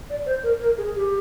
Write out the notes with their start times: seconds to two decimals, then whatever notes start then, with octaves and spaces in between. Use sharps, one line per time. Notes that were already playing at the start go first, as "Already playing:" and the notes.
0.10 D5
0.26 C5
0.43 A#4
0.61 A#4
0.78 G#4
0.95 G4